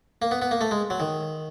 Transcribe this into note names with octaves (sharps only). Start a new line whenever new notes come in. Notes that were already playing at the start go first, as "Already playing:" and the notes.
A#3
B3
B3
A#3
A3
G#3
F#3
D#3